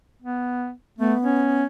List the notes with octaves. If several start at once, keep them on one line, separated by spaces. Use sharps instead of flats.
B3
A3 B3
C#4